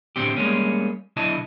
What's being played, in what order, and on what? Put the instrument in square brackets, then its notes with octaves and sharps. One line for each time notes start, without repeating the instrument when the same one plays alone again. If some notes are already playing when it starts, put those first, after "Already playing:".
[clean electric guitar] A2 D3 D#3 C4 G4
G3 G#3 A#3 C#4
B1 D3 E4 D#5 A5